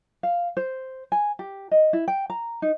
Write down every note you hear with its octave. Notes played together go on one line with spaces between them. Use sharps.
F5
C5
G#5
G4
D#5
E4
G5
A#5
D#4